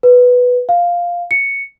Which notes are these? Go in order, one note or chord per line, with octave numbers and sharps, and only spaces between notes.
B4
F5
C#7